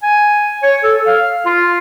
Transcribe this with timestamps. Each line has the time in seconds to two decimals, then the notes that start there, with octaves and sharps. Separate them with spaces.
0.03 G#5
0.63 C#5
0.83 A4
1.07 F5
1.46 F4